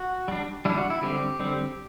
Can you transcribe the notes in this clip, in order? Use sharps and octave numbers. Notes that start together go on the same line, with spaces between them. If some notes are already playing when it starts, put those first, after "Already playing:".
Already playing: F#4
G3 D4
G3 D4 E4
F#4
E4
D3 G3 C4 G4
D3 G3 C4